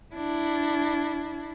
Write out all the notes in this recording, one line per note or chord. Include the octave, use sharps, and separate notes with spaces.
D4 E4